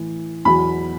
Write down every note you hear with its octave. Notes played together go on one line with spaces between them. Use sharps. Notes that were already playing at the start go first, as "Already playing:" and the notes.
Already playing: A2 E3
E2 B2 F#3 B5